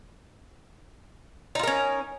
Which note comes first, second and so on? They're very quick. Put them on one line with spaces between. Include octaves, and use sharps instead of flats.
D#4 F4 A#4 C#4